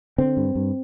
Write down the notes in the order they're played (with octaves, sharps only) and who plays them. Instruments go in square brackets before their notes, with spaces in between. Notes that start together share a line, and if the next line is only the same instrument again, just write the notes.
[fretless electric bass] D3 C4
G2
G2